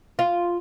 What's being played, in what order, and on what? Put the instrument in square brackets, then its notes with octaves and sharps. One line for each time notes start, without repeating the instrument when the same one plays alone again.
[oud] F4